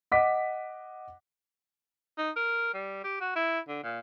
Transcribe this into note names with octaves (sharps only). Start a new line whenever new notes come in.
D#5 F#5 D6 B6
D#4
A#4
G3
G4
F#4
E4
D3
A#2